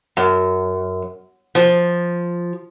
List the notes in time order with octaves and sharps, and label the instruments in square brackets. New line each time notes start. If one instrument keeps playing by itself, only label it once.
[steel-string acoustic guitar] F#2
F3